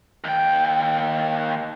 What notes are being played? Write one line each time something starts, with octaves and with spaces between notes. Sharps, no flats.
D#2 G5